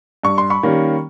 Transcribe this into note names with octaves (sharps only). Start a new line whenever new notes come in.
G2 C#6
C6
B5 C#6
D#3 G3 A#3 C#4